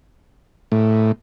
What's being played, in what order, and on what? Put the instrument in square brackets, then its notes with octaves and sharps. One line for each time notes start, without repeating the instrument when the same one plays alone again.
[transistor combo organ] A2